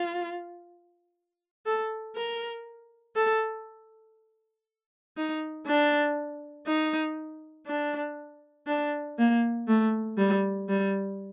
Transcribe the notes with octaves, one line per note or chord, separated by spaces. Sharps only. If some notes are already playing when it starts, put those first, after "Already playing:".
Already playing: F4
A4
A#4
A4
D#4
D4
D#4
D4
D4
A#3
A3
G3
G3